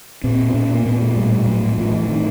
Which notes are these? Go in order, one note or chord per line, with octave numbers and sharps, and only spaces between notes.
A#2 C4
C4
A#2 C#4
A#3
A#2 B3
G#3
A2 G3
A2 F#3
F#3
A2 F3
E3
A2 D#3